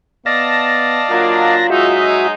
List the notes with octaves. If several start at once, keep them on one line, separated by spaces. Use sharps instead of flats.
B3 D5 D#5 F5 A5 A#6
F#3 A#3 D4 F4
F#3 G#3 D#4 F#4 E5